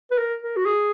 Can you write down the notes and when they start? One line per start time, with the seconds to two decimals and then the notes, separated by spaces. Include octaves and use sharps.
0.11 B4
0.18 A#4
0.43 A#4
0.57 F#4
0.66 G#4